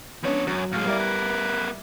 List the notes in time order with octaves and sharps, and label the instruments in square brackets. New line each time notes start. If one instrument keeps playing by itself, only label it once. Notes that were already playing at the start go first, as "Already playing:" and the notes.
[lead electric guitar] F3 C#5 [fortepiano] B3 C#4 D4
[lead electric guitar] F#2 [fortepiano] F#3
[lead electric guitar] A2 G#3 [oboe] F5
[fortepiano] G3 E4 D5 [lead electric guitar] B3 A#4
[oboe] B4